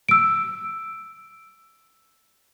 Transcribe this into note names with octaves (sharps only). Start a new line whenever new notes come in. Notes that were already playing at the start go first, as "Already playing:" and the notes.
E6 D7